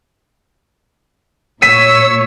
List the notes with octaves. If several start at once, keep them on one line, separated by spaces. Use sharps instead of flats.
A#2 C#5 E6 B6 D#7